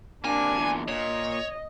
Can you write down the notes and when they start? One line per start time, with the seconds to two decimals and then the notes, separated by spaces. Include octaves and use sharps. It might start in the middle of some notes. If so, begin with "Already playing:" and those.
0.25 C3 A#3 D4 G#5
0.58 E2 A#2
0.88 A#2 C#5 D#5